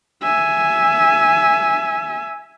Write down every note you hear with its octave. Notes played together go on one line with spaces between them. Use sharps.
E5 G#5